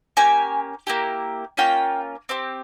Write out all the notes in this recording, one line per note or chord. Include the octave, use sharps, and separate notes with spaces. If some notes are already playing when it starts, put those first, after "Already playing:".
A#3 C#4 G4 G#5
A#3 E4 G4
A#3 C#4 F4 G5
C4 G4